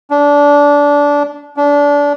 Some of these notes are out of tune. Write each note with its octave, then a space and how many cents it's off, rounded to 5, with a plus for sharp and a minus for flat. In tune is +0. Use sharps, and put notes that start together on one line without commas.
D4 -20
D4 -25